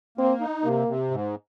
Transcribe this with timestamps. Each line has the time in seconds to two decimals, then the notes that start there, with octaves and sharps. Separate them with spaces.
0.18 A#3 C4
0.41 D#4
0.64 C3 A#3
0.88 C3
1.11 G#2